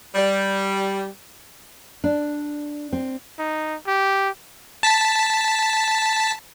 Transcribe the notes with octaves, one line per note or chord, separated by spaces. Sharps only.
G3
D4
C4
D#4
G4
A5 B6